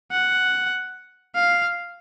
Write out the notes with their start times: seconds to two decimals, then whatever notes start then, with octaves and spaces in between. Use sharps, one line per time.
0.12 F#5
1.35 F5